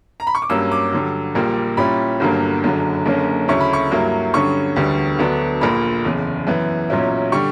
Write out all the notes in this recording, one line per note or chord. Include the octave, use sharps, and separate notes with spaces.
A#5
B5
C#6
D6
G2 F#3 A#3 C#4 E6
D6
G2 D3 F#3
A#1 A#2 G3 A#3
A#2 G3 C#4 E4 B5
G1 G2 D3 F#3 A#3
F#1 F#2 D3 F#3
F#1 F#2 D3 A#3 C#4
D2 C#3 F#3 C#4 E4 C#6
B5
C#6
G2 F#3 A#3 E4
G2 D3 F#3 C#4 C#6
E1 D2 D3 G3 B3
D2 D3 F#3 B3 D4
A#1 A#2 A#3 B5
F#1 E2 C#3
F#2 E3 B3
B1 A#2 F#3 C#4 E4
D3 G3 C#6